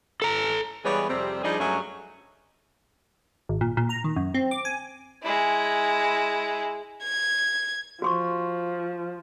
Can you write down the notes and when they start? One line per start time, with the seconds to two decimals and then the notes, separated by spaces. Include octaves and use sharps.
0.22 A4 A#5
0.85 E3 G3 G#3 B3 G#4 C#5
1.09 F2 C3 G3 C4
1.43 F3 G3 D4 D#4 G#4
1.60 G2 F#3 G#3 A3 C#4
3.49 G#1
3.61 A#2
3.77 A#2
3.89 A#5
4.04 D#3
4.16 F#2
4.34 C4
4.51 D6
4.65 G#5
5.23 G#3 E4
7.04 G#6
8.02 F3 F#4 C6 C#6